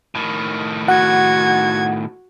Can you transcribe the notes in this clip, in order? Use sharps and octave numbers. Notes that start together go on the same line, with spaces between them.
A2 D#3
F#4 F#5 G#6